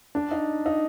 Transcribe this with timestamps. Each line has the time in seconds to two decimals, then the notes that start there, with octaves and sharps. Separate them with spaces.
0.15 D4
0.31 D#4
0.66 D#4